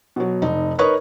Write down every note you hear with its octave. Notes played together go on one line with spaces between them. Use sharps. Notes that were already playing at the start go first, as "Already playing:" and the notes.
B2 F#3
F1 D#4
D#4 A#4 B4 C#5 C#6 D#6